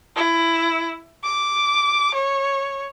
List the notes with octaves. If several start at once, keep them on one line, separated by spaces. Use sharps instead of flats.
E4
D6
C#5